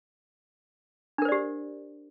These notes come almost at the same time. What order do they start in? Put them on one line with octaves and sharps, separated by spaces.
D4 A#4 C5 D5 G4